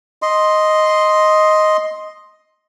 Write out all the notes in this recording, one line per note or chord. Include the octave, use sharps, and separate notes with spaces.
D#5 C6